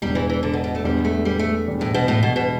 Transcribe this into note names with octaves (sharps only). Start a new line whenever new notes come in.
E1 E2 D3 G3
E3
E3
D3
B2
B2
A3
E2 D3 G3 B3
A3
G3
A3
E1 E2 D3 G3
A2
B2
A2
B2
B2